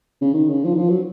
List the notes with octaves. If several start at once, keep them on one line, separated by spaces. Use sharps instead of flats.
C#3
D#3
C#3
F3
D#3
F3
F#3